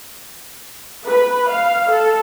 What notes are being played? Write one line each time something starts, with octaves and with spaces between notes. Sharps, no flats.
B4
F5
A4